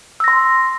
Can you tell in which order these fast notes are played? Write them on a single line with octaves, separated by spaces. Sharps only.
E6 A#6 C6